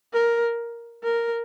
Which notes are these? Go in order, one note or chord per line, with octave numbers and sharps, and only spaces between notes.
A#4
A#4